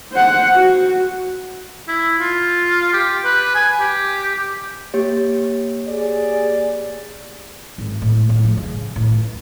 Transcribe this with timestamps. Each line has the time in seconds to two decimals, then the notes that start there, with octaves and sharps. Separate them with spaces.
0.12 C5 F#5
0.55 F#4
1.88 E4
2.20 F4
2.93 G4
3.25 B4
3.55 G#5
3.80 G4
4.94 A#3 G4 C#5
5.89 G#4 D5
7.78 G#1
8.02 A2
8.29 A2
8.44 F3
8.57 C#3
8.96 A2
9.08 C#2